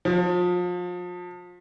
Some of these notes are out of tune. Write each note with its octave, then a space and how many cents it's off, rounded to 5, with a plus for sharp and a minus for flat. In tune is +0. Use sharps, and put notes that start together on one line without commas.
F3 +30